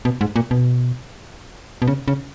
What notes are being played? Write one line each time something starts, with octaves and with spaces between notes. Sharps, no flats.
B2
G#2
A#2
B2
B2
C#3
C#3